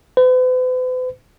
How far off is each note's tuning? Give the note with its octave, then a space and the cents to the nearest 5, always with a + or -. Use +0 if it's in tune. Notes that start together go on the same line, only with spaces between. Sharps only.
B4 +45